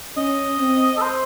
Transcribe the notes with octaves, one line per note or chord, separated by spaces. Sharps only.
C#4 D#5
C4
A4
C5